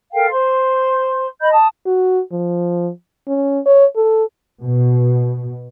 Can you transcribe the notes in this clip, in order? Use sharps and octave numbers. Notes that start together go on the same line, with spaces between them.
A4 A#4 F5 G5
C5 C6
D#5 B5 G6
A5 D#6
F#4
F3
C#4
C#5
A4
B2